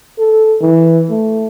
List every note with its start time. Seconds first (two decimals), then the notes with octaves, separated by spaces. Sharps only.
0.19 A4
0.61 E3
1.10 A3